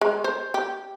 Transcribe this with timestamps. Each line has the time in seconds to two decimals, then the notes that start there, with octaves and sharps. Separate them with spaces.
0.01 G#3
0.24 C5
0.54 G4